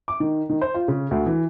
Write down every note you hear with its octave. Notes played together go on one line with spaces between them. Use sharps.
D6
D#3
D#3
C5
F4
C#3
D2
E3